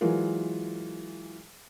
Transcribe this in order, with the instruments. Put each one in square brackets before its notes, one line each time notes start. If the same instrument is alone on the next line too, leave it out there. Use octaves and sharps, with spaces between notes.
[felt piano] E3 F#3 G#3 F4 A#4